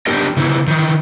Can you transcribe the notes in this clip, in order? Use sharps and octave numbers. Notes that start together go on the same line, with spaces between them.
B3 D4 D#4 G4 A#4 D#5
C#3 E3 B3 D#4 E4
D#3 E3